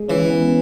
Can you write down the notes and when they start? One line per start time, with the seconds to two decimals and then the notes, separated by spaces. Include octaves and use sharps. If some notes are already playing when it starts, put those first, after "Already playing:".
Already playing: G#3 G#4
0.08 E3 C#4
0.30 B3